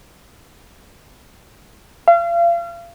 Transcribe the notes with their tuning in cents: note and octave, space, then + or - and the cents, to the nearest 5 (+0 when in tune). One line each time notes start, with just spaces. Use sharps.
F5 -35